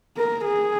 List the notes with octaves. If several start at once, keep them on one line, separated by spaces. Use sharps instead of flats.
A#4
G#4